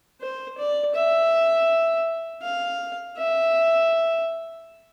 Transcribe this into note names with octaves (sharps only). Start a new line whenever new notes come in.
C5
D5
E5
F5
E5